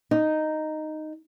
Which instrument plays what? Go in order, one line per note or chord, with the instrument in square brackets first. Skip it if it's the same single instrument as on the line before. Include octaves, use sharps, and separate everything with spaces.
[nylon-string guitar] D#4